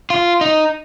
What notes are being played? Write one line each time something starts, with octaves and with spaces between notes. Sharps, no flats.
F4
D#4